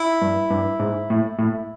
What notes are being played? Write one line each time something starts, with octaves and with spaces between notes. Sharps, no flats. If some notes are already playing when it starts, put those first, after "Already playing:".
Already playing: E4
G2
G2
G#2
A2
A2